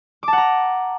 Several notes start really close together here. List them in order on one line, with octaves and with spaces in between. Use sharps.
D6 A5 F#5 A#5